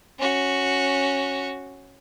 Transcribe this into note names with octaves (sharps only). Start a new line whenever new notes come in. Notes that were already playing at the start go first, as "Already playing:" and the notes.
C#4 F#4